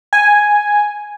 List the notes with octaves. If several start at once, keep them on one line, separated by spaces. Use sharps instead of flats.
G#5